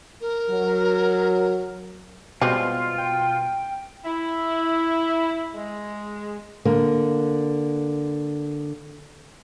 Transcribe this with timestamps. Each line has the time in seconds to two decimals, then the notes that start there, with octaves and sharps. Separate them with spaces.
0.21 A#4
0.49 F#3
2.42 B2 G3 G#3 C4 F4
2.98 G5
4.04 E4
5.55 G#3
6.65 D3 A#3